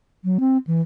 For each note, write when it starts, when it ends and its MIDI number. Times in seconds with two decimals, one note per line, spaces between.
0.24 0.38 54
0.40 0.58 60
0.67 0.81 52